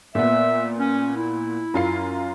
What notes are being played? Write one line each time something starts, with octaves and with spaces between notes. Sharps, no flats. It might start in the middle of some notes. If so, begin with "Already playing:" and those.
A#2 B3 E5
C#4
E4
F#2 F4 C7